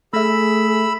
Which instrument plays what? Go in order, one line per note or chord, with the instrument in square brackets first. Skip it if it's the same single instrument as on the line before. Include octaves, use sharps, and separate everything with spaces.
[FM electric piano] A3 E5 [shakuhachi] G#4 [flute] A4 [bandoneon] B5 E6